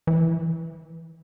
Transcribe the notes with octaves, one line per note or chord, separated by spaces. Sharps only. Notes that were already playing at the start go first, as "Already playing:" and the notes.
E3